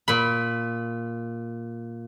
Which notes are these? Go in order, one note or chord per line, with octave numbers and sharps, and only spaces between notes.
A#2 B5